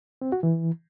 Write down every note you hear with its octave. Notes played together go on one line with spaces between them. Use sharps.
C4
F#4
E3